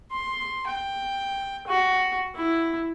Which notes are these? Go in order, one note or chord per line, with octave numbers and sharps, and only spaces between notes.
C6
G5
F#4
E4